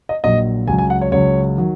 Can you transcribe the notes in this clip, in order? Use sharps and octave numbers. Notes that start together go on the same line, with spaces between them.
D#5
A#1 A#2 F#3 D#5
C#2 C#3 F#3 G#5
G#5
F#5
C#5
C#2 C#3 F#3 C#5
D#3 F#3